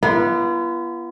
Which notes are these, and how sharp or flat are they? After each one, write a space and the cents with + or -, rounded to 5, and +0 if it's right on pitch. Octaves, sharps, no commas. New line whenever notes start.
B3 -20 F4 -40